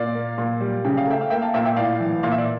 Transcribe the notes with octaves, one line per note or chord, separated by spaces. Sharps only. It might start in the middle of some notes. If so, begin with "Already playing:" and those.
Already playing: A#2 D5 F5
A#3
A#2
G3
C#3 G5
F5
A3 E5 G5
F5
A#3 E5 G5
F5 A5
A#2 E5 G5
E5 G5
A2 D5 F5
E3
A#2 F5
E5
D5